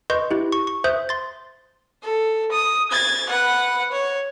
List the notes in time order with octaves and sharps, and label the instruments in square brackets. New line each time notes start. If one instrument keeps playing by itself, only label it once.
[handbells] B4 D#5 C6 C#6 G6
E4 G4
C#6
C#6
C5 E5 D#6 F#6 G6
C6 A6
[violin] A4
D#6
G#6 A6
B4 F#5
C#5